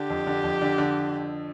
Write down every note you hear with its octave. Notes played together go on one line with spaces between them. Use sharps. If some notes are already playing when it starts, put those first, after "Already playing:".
Already playing: D3 G4
F2
D3
F2
D3
D3